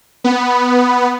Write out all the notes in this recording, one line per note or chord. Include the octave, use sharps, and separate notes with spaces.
B3